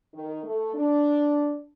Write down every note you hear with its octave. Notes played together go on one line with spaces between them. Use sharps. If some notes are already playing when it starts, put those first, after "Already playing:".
D#3
A3
D4